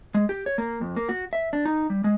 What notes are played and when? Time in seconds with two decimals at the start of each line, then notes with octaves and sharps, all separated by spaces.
0.15 G#3
0.29 G4
0.46 C#5
0.58 A#3
0.81 F2
0.97 A#3
1.09 F#4
1.33 E5
1.53 D4
1.65 D#4
1.90 G3
2.04 G#3